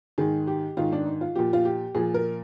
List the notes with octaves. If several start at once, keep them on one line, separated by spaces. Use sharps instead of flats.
G#2 D#3 G#4
G4
G#2 D#3 F4
D4
D#4
F4
A#2 F3 G4
F4
G4
A#2 F3 G#4
A#4